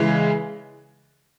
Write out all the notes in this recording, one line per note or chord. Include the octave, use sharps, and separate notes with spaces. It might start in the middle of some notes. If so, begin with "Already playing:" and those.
Already playing: C#3 E3 G#3